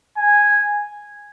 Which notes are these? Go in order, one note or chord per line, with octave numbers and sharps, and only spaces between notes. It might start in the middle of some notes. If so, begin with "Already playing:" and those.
G#5